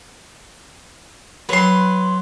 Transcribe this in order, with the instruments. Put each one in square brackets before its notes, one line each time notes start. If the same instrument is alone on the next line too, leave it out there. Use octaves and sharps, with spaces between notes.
[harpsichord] F#3 [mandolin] B4 C6